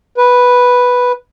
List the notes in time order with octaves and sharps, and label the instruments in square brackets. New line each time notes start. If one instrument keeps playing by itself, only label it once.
[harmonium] B4